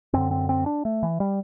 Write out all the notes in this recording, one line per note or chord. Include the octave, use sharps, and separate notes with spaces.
F#2 D3 C4
C4
C4
D4
A3
E3
G3